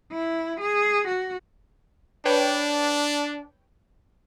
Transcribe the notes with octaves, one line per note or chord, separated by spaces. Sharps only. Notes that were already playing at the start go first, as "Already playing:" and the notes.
E4
G#4
F#4
D4 B4 C#5 G5